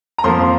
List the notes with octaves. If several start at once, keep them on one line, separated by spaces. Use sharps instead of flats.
A#5
F2 F3 A#3 C6